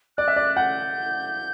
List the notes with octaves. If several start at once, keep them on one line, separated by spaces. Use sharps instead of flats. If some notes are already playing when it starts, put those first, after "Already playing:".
D5 F#6
E5
D5
F#5 G6